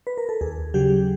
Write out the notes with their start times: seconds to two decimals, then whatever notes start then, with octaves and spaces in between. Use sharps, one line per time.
0.07 B4
0.18 A#4
0.29 A4
0.41 D#2 G#4
0.74 C#3 F#3 G4